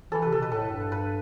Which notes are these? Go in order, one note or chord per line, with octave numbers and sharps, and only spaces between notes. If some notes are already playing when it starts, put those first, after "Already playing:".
E3 A4
C3 B4
A4
B2 B4
A2 A4
G2
B4